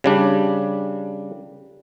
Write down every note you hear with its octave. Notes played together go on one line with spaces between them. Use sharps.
C#3 G3 D4